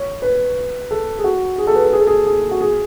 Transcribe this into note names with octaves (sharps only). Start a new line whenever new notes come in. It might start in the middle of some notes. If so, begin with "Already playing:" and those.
Already playing: C#5
B4
A4
G#4
F#4
G#4
A4
B4
A4
G#4
A4
G#4
G#4
F#4
G#4